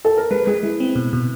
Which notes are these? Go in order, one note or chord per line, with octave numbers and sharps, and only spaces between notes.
A4
A#4
G#3 B4
G#3 G#4
G#3 E4
C4
B2
B2